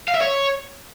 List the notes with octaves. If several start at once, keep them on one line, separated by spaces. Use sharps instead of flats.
F5
E5
C#5